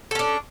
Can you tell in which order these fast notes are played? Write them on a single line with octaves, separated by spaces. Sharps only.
A4 C#4 D4